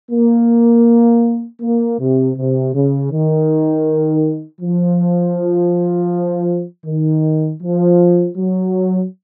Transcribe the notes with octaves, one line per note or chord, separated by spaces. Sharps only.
A#3
A#3
C3
C3
C#3
D#3
F3
D#3
F3
F#3